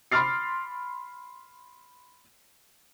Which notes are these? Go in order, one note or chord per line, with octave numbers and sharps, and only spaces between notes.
B5 C6 D6 F6 A6 C7